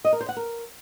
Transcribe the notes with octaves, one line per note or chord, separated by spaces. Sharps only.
D#5
A#4
C5
F#5
A#4